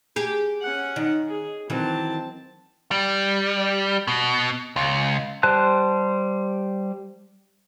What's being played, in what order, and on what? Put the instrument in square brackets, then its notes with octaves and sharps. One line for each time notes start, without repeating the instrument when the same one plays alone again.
[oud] G4 G#4
[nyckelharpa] C#4 F#5
[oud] D#3
[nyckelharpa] G#4
[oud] D#3 E3 F#3 [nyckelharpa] C4 A5
[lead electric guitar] G3
B2
C#2
[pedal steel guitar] G3 C5 A5 F#6